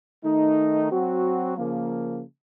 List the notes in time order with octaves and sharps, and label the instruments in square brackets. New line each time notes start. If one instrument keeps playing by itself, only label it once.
[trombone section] D#3 A3 D#4
F#3 C4 F#4
C#3 F3 A#3